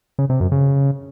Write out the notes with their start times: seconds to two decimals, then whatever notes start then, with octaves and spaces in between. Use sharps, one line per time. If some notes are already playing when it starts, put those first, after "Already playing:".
0.19 C#3
0.30 C3
0.41 F#2
0.52 C#3